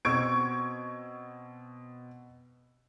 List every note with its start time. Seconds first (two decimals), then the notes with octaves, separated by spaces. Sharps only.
0.05 B2 C4 C#6 E6 G#6 D7